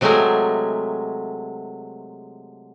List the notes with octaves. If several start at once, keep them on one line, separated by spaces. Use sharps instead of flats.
C3 F#3 G#3 A3 G#4 A#4